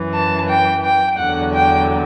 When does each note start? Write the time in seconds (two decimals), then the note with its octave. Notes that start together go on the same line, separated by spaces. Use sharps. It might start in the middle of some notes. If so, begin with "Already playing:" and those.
Already playing: F#2 E3
0.14 A5
0.48 G5
0.84 G5
1.19 E2 D3 F#3 F#5
1.54 G5